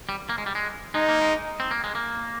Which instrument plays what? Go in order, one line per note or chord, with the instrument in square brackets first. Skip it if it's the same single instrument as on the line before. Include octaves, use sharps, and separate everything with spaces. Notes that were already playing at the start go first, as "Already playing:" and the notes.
[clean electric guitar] G3
A#3
G#3
G3
G#3
[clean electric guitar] G#3 [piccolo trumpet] D#4
[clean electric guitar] A#3
G#3
C4
A#3
G#3
A#3